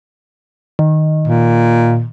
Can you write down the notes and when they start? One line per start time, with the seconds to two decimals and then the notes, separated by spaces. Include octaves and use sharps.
0.79 D#3
1.28 A#2